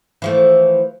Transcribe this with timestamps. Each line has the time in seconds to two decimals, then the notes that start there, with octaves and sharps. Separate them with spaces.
0.22 E3 F3 A3